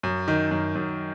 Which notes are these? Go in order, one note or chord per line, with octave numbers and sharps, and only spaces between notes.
F#2
D#3
F#2
F#2